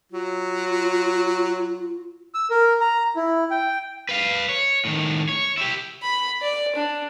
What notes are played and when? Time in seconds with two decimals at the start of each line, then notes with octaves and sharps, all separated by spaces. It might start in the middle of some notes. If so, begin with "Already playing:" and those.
0.12 F#3 F4
2.35 E6
2.51 A#4
2.81 A#5
3.16 E4
3.51 G5
4.09 B4 F5
4.49 C#5
4.85 A2 D#3
5.29 C#5
5.57 E4 G4
6.03 B5
6.42 D5
6.76 D4